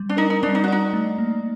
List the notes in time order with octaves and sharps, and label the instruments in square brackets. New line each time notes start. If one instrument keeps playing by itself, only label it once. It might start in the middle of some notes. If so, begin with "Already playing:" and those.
Already playing: [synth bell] G3
[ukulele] D4
[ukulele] D#4 [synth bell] A#4
[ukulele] D#4
[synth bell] G3 [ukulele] D4
[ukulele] D#4
F#4
[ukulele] D#4 [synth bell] D5
[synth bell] A3
A#3